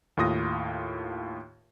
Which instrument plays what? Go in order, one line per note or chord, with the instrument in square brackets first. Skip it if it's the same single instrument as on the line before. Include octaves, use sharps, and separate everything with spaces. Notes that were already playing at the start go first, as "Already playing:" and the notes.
[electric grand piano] D#2 A2 F4 D#6 A#6